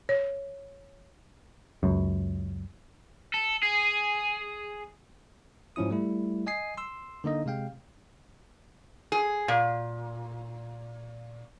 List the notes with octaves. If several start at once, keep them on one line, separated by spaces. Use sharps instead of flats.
C#5
C#2 F#2
A4
G#4
G#2 F3 C#4 E4 D#6
G3 A3 E4
D#5 G#5 D#6 C7
C6 E6
D3 A#3 D#4 D#5
C3 G#3 F5 G5
G#4
A#2